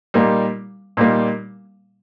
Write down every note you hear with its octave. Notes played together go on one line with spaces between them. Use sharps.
A#2 G3 A#3 D#4
A#2 G3 A#3 D#4